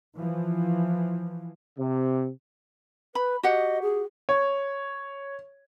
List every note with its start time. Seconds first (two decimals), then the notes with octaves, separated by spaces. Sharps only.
0.16 E3 F3
1.78 C3
3.15 B4 B5
3.43 F#4 G4 D#5 F#5
3.82 G#4
4.29 C#5